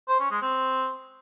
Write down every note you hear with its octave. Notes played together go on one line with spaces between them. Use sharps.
C5
C#4
G#3
C4